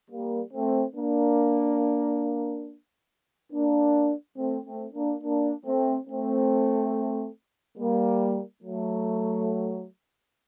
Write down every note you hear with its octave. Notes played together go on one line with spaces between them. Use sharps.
G3 A#3
A3 C4
A#3 D4
A#3 D4
A3 C4
A3 C4
A#3 D4
A#3 D4
A3 C4
A3 C4
G3 A#3
F#3 A3